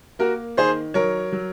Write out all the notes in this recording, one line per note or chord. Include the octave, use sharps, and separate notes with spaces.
A#3 F#4 A#4
D#3 G#4 C5
F#3 A#4 C#5
F#3